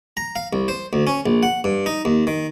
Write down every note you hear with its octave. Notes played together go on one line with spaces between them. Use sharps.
A#5
F5
C2
C5
D2
C#4
A#1
F#5
G2
D#4
D#2
D#3